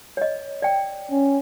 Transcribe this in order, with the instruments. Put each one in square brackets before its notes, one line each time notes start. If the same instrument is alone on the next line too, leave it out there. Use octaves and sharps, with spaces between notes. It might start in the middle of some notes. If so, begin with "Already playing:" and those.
[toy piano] C#5 D#5
D5 G5
[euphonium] C#4